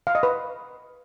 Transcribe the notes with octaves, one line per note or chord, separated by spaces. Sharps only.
F5
D#5
B4